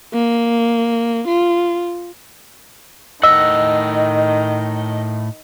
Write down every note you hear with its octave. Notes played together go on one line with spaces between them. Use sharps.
A#3
F4
A2 D#3 D#5 F#5 E6